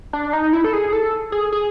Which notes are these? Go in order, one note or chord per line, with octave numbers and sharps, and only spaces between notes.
D4
D#4
E4
A4
G#4
A4
G#4
G#4